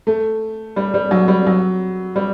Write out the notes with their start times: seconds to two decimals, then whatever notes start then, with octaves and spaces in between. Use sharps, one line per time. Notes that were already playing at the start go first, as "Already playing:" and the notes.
0.07 A3
0.76 G3
0.94 G3
1.11 F#3
1.28 G3
1.47 F#3
2.16 G3